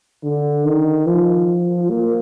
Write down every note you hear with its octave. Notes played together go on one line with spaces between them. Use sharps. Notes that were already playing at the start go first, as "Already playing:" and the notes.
D3
D#3
F3
A#3